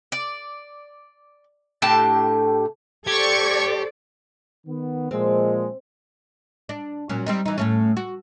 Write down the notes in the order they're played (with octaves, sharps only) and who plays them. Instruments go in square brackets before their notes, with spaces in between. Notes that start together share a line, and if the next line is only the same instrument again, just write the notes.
[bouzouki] D5
A2 D4 G4 A5
[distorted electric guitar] G4 [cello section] A4 C5 D5 [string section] C#6 G#6
[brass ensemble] D#3 B3
[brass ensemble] A#2 F3 G#3 [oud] C4
[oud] D4
A#2 F#3 C#4
G3 C4 D#4
E3 D#4
A2 A3 C#4
F#4